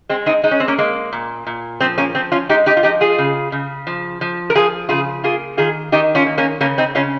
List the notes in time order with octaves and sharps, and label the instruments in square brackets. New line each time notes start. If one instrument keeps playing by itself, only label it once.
[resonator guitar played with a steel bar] G#3 C4
C4 D#4
G#3 D#4
C#4
C4
A#3 C#4
G#3 A#3
A#2
A#2
F3 C4
A#3 C#4
F3 C4
C#4 F4
G#3 D#4 G4
D#4 G4
F4
F3 D#4 G4
F4 G#4
C#3
C#3
F3
F3
A#4
F3 F4 G#4
C#3 F4 G#4
A#3 F4 G#4
D#3 F4 G#4
D#3 D#4 G4
C#4 F4
A#3
A#3 C#4
C#3 A#3 C#4
C4 D#4
C#3 C#4 F4